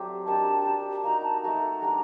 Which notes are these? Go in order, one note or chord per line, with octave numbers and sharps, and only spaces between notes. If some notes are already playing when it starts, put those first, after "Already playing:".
Already playing: F#3 A3 C4 G4 C5 D5
D4 G4 A#4 D#5 A5
D4 G4 A#4
A#3 D#4 F#4 A#5
A5
A3 D#4 F#4 A4 A#5
G3 D4 F#4 A#4